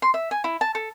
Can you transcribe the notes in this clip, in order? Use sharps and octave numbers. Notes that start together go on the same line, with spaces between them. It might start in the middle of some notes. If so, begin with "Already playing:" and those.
C6
E5
G#5
E4
A5
A4